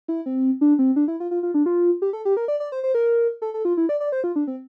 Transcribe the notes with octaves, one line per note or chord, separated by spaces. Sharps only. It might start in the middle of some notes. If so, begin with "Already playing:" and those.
E4
C4
D4
C4
D4
E4
F4
F4
F4
D4
F4
G4
A4
G4
A#4
D5
D5
C5
C5
A#4
A4
A4
F4
E4
D5
D5
C5
F4
D4
C4